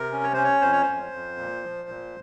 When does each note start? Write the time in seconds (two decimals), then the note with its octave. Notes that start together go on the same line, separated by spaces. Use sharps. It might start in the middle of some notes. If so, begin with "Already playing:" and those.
Already playing: C3 A#4
0.12 C#4
0.23 C#5
0.34 C#4 C5
0.44 C#5
0.61 F2 C5
0.72 C#5
0.83 F2 C5
1.12 F2
1.38 A#2
1.63 F3
1.89 A#2